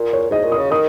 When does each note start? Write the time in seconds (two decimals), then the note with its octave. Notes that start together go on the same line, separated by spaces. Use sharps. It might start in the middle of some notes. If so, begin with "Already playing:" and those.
Already playing: A#2
0.13 C#5
0.30 G#2 D#5
0.44 A#2
0.52 D#6
0.58 C#3
0.71 D#3 D#6